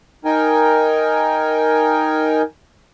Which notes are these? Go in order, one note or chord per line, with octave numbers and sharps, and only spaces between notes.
D#4 A#4 G5 G#5